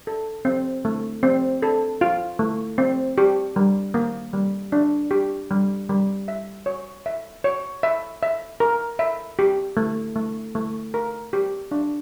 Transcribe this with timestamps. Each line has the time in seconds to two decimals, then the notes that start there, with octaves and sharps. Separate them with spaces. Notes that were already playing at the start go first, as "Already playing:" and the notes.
0.07 A4
0.45 C4
0.85 A3
1.23 C4
1.62 A4
2.01 F4
2.39 A3
2.78 C4
3.18 G4
3.56 G3
3.94 A#3
4.33 G3
4.72 D4
5.11 G4
5.51 G3
5.89 G3
6.28 E5
6.66 C#5
7.06 E5
7.44 C#5
7.83 E5
8.23 E5
8.60 A#4
8.99 E5
9.39 G4
9.77 A3
10.15 A3
10.55 A3
10.94 A#4
11.33 G4
11.71 D4